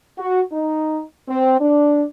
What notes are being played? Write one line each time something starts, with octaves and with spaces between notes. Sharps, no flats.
F#4
D#4
C4
D4